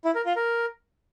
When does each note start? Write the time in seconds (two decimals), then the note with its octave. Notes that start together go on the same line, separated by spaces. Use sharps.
0.05 E4
0.15 A#4
0.26 F4
0.36 A#4